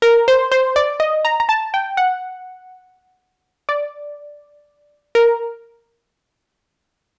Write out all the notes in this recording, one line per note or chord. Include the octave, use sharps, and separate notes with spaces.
A#4
C5
C5
D5
D#5
A#5
A#5
A5
G5
F#5
D5
A#4